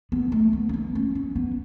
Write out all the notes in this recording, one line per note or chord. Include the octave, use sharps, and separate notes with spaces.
B3
A3
B3
C#4
B3
C#4
C#4
B3